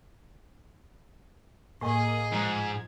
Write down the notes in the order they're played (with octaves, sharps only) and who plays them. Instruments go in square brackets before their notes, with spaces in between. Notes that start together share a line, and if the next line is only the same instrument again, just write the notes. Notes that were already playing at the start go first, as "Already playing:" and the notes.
[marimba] A2 G#5 [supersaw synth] A#3 [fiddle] G#4 D#5
[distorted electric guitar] G#2 [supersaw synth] F3 G#6